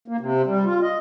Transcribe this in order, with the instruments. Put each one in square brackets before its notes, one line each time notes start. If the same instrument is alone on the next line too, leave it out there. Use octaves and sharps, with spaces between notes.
[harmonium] A#3
C3
G3
F4
D#5